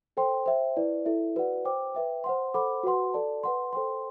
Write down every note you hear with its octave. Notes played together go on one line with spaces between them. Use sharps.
A4 C5 G5 C6
C5 E5 G5
E4 B4 D5
E4 A4 E5
F#4 B4 D5 F#5
C5 G5 D6
B4 E5 G5
C5 F#5 C6
A4 C5 F#5 B5 D6
F#4 B4 F#5 C6
A4 D5 A5
B4 F#5 C6
A4 C5 G5 C6